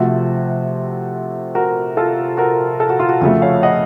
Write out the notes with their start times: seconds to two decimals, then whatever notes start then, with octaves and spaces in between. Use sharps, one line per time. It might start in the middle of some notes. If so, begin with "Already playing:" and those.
Already playing: C3 F3 A3 F#4
1.55 F#4 A#4
1.97 F4 A4
2.37 F#4 A#4
2.80 A4
2.89 F#4
3.00 F4
3.09 F#4
3.21 F2 C#3 A3 F#4
3.42 C#5 F5
3.63 D#5 F#5